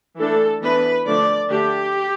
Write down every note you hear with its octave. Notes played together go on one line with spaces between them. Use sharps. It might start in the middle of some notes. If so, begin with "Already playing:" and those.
E3 A3 D4 A4
E3 B3 D4 B4
D3 F3 A3 D4 D5
D3 A3 D4 G4